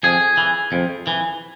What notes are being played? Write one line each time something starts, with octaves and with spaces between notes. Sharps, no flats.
F2 G#4
E3
F2
E3